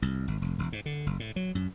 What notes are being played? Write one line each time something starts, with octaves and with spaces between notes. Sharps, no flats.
C2
G#1
F1
E1
G#2
D3
F#1
A2
F#3
F#2